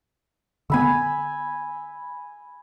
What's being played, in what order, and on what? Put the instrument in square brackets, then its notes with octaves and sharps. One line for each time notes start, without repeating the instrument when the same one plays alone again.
[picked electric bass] D3 B3 [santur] G#5 B5 E6